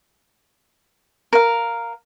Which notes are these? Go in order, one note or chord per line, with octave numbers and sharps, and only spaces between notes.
A#4 F5